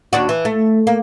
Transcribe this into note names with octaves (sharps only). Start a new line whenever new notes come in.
D#2 D4 F#4
E3
A3
A#3